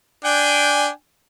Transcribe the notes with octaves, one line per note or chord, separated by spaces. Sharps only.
D4 G5 G#5